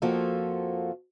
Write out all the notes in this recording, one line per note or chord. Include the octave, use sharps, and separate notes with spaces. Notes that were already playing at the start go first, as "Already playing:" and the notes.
F2 F3 A#3 F4 F#4 A4